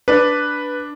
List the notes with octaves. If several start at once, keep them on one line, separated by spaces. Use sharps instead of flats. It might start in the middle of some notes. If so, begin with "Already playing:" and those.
D4 B4